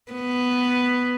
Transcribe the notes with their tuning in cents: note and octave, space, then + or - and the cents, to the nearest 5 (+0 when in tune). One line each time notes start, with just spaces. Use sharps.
B3 +5